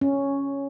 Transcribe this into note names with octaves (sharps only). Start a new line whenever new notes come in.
C#4